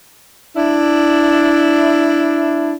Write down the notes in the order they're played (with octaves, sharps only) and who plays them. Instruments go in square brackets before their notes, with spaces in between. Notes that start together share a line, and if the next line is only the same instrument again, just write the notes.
[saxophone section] D4 E4